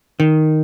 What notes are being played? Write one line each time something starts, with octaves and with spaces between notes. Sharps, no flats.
D#3